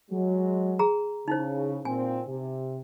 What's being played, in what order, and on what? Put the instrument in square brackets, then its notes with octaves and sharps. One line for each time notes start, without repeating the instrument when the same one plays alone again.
[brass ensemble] F#3 G#3
[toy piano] G#4 A#5
[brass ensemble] C#3 [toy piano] D#4 E4 C5
[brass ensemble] A#2 C4 [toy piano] G#5
[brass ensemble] C3